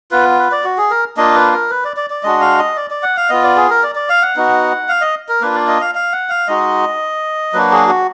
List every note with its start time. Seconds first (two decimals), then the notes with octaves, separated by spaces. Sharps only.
0.11 B3 F4 B4
0.39 B4
0.52 D5
0.64 F#4
0.78 G#4
0.91 A#4
1.17 A#3 D4 F4 D#5
1.35 B4
1.52 A#4
1.70 B4
1.85 D5
1.97 D5
2.10 D5
2.23 G#3 D4 F#4 D#5
2.41 F5
2.58 D#5
2.76 D5
2.91 D5
3.03 F#5
3.17 F5
3.29 B3 F4 D#5
3.44 D5
3.56 G#4
3.70 A#4
3.83 D5
3.95 D5
4.09 F5
4.22 F#5
4.36 B3 D#4 F#4
4.89 F5
5.01 D#5
5.29 A#4
5.41 A#3 D4 F4 B4
5.55 D5
5.68 D#5
5.81 F5
5.95 F5
6.12 F#5
6.29 F5
6.47 G#3 D#4 F#4 D#5
7.53 F#3 A#3 D4 F#4 B4
7.72 G#4
7.89 F#4